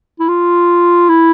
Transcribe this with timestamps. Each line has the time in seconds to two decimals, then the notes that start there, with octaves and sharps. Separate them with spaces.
0.19 E4
0.28 F4
1.09 E4